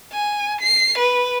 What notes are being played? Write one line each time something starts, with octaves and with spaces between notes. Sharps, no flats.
G#5
C7
B4